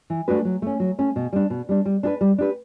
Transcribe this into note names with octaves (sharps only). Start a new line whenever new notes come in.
E3
A3 D4 F#4 B4
F#3
A3 C#4
F#3
A3 C#4
B2
G3 D4
B2
G3 D4
G3
D4 G4 B4
G3
D4 G4 B4